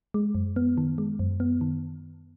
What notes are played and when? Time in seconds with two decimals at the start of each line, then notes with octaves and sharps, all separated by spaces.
0.14 G#3
0.35 F#2
0.56 B3
0.78 D#3
0.98 G#3
1.19 F#2
1.40 B3
1.61 D#3